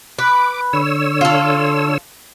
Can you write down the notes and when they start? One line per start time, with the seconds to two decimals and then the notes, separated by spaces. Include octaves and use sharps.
0.18 B4 D6
0.73 D3 C#5 E6
1.21 F4 A4